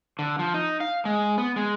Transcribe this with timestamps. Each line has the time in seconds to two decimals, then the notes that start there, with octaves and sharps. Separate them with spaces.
0.19 D3
0.39 F3
0.54 D#4
0.80 F5
1.05 G#3
1.38 B3
1.56 G#3